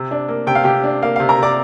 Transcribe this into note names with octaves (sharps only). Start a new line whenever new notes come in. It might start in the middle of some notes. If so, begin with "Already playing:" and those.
Already playing: C3
D4
A#3
C3 G5
F5
C3 G4 G5
D4
A#3 F5
C3 F5
A#4 A#5
C3 D5 D6